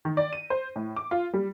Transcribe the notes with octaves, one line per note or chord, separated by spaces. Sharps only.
D#3
D5
D#7
C5
A2
D6
F4
G3